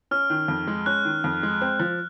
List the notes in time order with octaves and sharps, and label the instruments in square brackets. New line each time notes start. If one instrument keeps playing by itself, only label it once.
[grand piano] C#4 [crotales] F6
[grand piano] D#3
F2
G#3
[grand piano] C#4 [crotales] F#6
[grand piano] D#3
F2
G#3
C4
F3